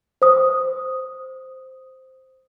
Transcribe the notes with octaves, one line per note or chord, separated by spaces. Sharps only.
C5 D#6